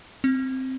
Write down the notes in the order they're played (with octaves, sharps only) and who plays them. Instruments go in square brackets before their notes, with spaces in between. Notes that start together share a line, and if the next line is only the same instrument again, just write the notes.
[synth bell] C4